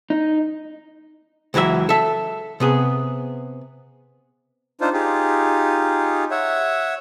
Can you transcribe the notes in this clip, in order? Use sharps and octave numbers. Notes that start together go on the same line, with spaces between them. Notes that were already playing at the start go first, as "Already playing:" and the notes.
D#4
C#2 E3 F#3 B4 E5
A4 E5
C3 B3 G#4
D4 D#4 F4 C5
D#4 F4 G4 G#4
C#5 E5 F#5